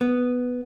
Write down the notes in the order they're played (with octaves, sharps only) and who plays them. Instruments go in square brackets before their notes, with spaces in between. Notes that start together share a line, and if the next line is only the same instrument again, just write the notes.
[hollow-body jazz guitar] B3